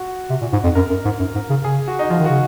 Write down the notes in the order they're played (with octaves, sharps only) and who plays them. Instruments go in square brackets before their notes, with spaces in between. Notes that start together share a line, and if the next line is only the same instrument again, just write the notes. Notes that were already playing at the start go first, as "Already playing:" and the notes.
Already playing: [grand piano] F#4
[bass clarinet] C3
A#2
G#2
F2
[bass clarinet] F#2 [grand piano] A#4
[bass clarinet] F#2
G#2
F#2
G#2
C#3
[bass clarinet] C#3 [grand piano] G#4
[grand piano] F#4
D#4
[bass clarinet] F3 [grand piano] F4
[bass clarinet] D#3
[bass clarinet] C#3 [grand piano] F#4